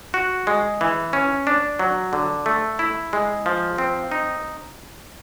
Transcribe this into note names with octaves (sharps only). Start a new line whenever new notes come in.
F#4
G#3
E3
C#4
D4
F#3
D3
A3
E4
G#3
F3
C4
D#4